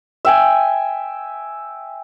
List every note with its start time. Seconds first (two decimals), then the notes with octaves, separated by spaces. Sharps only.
0.25 E5 G5 G#5